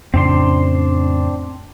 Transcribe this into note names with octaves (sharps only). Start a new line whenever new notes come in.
F2 A2 C#3 C4 D4 C6